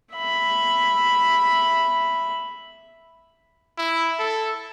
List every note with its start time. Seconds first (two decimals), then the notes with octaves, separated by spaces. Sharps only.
0.15 E5 B5
3.78 E4
4.19 A4